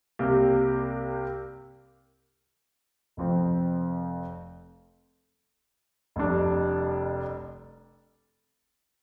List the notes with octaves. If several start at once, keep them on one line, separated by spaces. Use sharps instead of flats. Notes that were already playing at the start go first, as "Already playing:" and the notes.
C2 C3 A#3 G4
F1 F2 F3 C4
F1 F2 C3 G3 D4